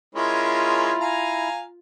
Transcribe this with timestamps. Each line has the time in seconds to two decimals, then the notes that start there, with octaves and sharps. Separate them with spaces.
0.15 G#3 C#4 E4 F4 A#4
1.01 F5 G#5 A#5